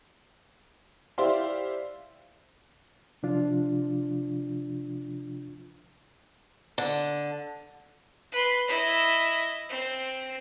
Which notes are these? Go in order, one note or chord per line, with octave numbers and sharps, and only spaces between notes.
E4 G4 C5 D5 F5 C6
C3 F3 D4 F4
D3
B4 C6
E4 D#5
C4